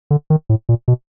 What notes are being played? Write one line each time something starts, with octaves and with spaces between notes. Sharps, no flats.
D3
D#3
A2
A#2
B2